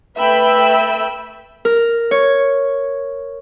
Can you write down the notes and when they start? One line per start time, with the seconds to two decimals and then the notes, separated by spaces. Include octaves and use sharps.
0.17 A3 B4 E5 G5 B5 E6
1.65 A#4
2.11 C#5